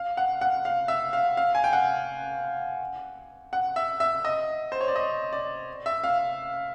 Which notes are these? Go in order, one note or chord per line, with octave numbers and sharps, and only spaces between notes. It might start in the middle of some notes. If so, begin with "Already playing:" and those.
Already playing: F5
F#5
F#5
F5
E5
F5
F5
G#5
G5
F#5
F#5
E5
E5
D#5
C5
C#5
D5
D#5
D5
E5
F5